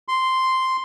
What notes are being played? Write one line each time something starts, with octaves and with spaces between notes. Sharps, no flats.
C6